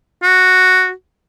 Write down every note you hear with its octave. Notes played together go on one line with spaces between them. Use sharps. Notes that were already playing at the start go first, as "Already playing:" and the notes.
F#4